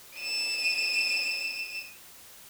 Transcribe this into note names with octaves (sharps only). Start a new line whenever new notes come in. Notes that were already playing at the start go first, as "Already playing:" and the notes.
D#7 E7